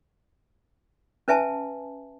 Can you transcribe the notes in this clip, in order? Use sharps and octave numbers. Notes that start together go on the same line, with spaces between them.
C#4 B4 E5 G#5 A5